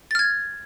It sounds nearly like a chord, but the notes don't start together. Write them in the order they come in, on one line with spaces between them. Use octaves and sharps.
A6 F6 G#6